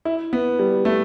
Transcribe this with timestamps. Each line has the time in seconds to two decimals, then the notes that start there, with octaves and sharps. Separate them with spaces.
0.05 E4
0.33 B3
0.59 G3
0.85 A3